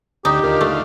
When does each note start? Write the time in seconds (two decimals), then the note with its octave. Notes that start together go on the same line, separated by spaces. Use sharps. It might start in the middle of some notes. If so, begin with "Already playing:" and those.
0.25 D2 D3 D#4 G4
0.44 D#2 D3 F4 A#4 D#5 D6
0.61 A3